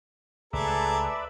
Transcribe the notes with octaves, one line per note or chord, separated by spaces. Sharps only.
C#2 A3 G#4 A4 B4 D5 E5 A#5